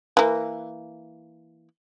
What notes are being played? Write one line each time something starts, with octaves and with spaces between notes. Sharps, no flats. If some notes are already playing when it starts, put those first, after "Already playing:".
E3 A#3